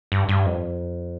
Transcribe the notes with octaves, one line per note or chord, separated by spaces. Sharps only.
G2
G2
F2